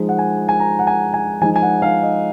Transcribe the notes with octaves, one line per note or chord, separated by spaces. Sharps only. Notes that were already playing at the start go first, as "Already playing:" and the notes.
Already playing: F3 G#3 D#4
F#5
G#5
G#5
A#5
F#5
G#5
G#5
F3 G#3 D#4 G#5
G#5
F#5
F5
D#5